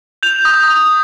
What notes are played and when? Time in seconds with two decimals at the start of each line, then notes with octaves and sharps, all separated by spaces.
0.23 G6 F7
0.45 D#6
0.68 D#6